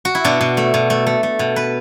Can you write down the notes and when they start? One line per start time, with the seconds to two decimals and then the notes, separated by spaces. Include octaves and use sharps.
0.05 F#4
0.15 E4
0.25 B2 D4
0.41 B2
0.57 A3
0.74 B2
0.90 A3
1.06 A3
1.23 A3
1.39 B2
1.56 B4